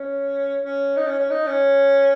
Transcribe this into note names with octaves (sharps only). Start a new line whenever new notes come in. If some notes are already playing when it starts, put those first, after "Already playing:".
Already playing: C#4
C#4
D#4
C#4
C#4
D#4
C#4